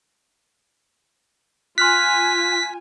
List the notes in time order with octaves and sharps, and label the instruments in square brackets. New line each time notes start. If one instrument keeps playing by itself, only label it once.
[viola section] F4 G#5 [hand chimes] C6 F6 F#6 [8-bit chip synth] B6